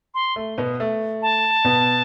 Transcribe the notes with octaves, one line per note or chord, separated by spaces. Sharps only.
C6
A3
B2 B3
A3
A5
B2 B3